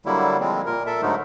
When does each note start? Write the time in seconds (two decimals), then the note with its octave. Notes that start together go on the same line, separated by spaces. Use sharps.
0.06 D3 F#3 G3 A#3 E4
0.40 F3 G3 G#3 C4
0.66 A#2 A#4
0.86 A4 A#4 E5
1.02 G#2 D3 F#3 A3 D#4